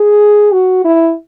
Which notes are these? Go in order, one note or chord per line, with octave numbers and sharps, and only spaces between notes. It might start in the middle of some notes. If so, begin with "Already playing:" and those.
Already playing: G#4
F#4
E4